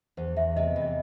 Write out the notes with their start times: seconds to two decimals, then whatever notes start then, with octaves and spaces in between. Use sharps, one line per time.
0.17 E2 C5
0.36 E2 E5
0.56 C3 D#5
0.76 E2
0.82 D#5